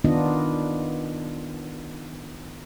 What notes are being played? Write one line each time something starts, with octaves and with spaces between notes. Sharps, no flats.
D#3 B3 D4 D#4 F4 D#5